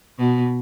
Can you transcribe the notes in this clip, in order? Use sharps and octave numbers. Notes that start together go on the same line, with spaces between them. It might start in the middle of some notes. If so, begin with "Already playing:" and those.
B2